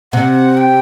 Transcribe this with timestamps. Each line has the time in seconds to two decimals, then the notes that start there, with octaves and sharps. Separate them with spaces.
0.12 C3 F#5
0.57 G5